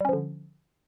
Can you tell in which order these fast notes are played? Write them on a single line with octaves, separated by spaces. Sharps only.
G3 C#4 F3 D3